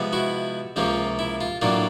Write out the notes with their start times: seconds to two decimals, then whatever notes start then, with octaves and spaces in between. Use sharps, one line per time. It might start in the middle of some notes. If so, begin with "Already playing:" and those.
Already playing: C3 F3 G#3 B3
0.13 E4 F#4
0.76 C#2 C3 F3 A#3 C#4 F4
1.19 E4
1.41 F4
1.62 A2 F#3 A#3 D4 F4